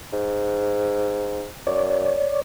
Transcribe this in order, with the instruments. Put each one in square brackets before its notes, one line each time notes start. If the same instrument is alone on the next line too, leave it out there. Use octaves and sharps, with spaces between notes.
[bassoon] G#2
[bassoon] F#2 [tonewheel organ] C#5 D5